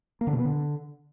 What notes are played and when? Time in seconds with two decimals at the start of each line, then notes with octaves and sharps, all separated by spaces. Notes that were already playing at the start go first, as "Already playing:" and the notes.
0.21 A#3
0.27 D3
0.33 B2
0.39 B3
0.45 D3